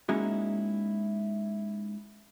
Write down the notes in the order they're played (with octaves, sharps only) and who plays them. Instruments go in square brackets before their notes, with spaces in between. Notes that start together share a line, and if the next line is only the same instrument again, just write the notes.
[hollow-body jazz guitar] G#3 A#3 C#4 D#4 E4 F#4